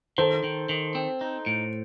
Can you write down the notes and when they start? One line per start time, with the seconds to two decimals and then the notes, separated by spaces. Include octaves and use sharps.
0.18 D#3 A4 C5
0.44 D#3
0.69 D#3
0.95 C4
1.21 D#4
1.46 A2